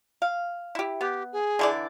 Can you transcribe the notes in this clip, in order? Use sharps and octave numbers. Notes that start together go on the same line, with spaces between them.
F5
E4 G4
B3 G4
G#4
D3 E3 D5